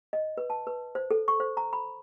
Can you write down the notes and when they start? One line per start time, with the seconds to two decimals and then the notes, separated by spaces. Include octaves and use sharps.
0.13 D#5
0.37 B4
0.50 A5
0.67 B4
0.95 C5
1.11 A4
1.28 C#6
1.40 C5
1.57 A#5
1.73 B5